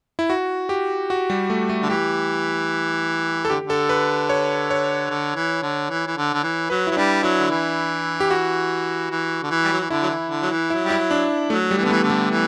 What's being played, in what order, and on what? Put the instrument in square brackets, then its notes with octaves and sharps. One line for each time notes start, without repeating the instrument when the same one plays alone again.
[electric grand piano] E4
F#4
G4
F#4
G3
A3
A3
[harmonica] D3
[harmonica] E3 [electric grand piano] G4
[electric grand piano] A4
[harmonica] D3 [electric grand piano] G4
[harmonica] D3 [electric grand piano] A4
[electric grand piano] B4
C#5
C#5
[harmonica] D3
E3
D3
E3
E3
D3
D3
E3
[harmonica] F#3 [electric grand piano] B4
[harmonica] F#3 [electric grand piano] E4
[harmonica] G3 [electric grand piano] D4
[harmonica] F#3 [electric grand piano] E4
[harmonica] D3
E3
[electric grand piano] G4
F#4
[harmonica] E3
D3
E3
G3
F#3
E3
[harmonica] D3 [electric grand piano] E4
[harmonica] F#3
E3
D3
F#3
E3
[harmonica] F#3 [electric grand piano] E4
[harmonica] G3 [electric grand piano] E4
[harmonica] F#3
[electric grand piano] D4
[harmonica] F#3 [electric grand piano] A3
[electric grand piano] G3
[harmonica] E3
[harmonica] D3 [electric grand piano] B3
[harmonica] E3 [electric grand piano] A3
[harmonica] D3
[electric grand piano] G3
[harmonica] E3